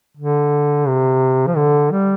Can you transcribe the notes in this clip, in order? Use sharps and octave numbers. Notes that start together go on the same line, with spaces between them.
D3
C3
F3
D3
G3